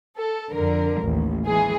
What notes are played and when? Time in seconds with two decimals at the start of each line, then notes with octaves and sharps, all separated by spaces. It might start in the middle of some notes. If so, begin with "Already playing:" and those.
0.16 A4
0.52 F2 D3 A#4
1.03 A1 D#2
1.45 E3 G#3 G#4